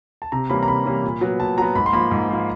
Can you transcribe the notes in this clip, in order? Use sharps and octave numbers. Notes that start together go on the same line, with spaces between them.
A5
C3 A#5
E3 G3 A#3 C#4 B5
A#5
C3 B5
E3 G3 A#3 C#4
A#2
F#3 B3
A#2 A5
F#3 B3 A#5
G#2 B5
C6
F3 A#3 B5
G#2
F3 A#3